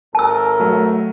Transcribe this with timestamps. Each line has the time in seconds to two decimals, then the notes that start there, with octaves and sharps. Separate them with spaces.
0.15 G#1 A4 A#4 A5 E6
0.60 F#3 A3